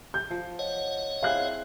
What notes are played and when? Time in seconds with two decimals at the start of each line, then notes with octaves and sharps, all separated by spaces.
0.14 G6
0.30 F3
0.59 C#5 D#5 F#5
1.23 C4 E4 G#4 F5 F#6